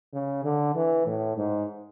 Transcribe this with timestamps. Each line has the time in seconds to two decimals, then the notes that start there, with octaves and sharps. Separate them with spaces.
0.13 C#3
0.44 D3
0.75 E3
1.06 A2
1.37 G#2